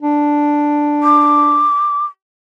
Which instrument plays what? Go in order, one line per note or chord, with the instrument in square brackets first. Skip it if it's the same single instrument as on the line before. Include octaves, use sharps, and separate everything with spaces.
[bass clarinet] D4
[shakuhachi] D6